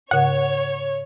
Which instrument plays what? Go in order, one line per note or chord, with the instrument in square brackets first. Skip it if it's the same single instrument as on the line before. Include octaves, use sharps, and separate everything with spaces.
[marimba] G#2 C#3 [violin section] C#5 [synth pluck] F#5